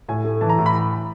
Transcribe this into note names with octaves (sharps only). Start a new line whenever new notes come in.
A2 G#5
A3
E3 A5
A#5
A2
B5